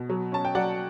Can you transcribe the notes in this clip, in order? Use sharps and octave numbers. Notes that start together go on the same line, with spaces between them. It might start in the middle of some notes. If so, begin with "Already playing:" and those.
Already playing: B2
F#3
C#4 A5
G5
F#3 D5 F#5